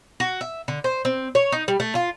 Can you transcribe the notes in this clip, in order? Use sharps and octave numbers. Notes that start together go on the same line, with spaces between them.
F#4
E5
D3
C5
C4
C#5
D#4
G3
A3
F4